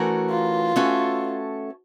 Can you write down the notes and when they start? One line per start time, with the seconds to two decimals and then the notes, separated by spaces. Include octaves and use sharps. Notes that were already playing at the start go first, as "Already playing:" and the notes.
Already playing: E3 A3 C#4 F#4 A#4
0.30 F4
0.76 A3 C#4 F#4 A4 C#5